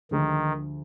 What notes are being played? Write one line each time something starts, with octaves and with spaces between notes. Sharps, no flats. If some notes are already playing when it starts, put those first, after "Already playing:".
D2 D3 D#3 F3 G#3